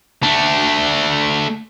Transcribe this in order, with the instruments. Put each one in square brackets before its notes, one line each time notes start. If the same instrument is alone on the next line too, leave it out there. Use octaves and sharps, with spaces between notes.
[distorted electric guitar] A3 D4